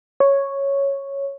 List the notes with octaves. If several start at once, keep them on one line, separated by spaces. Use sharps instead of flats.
C#5